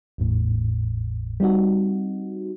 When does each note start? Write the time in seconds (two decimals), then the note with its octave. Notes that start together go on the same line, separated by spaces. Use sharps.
0.18 G#1 E2 A2
1.40 G3 C4 D#4 F#4